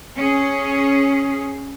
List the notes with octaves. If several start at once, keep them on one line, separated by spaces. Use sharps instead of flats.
C#4 G#4